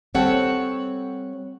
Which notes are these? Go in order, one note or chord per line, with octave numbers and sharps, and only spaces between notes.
G3 C4 A4 C#5 F#5